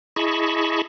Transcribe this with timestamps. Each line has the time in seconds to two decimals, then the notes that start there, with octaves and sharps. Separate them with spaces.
0.16 E4 G#4 D#5 A5 B5 C#6